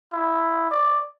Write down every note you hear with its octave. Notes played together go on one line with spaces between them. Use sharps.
E4
D5